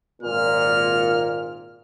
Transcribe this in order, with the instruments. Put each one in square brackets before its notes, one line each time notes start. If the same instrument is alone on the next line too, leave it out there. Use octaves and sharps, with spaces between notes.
[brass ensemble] G#1 A#2 [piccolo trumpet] F6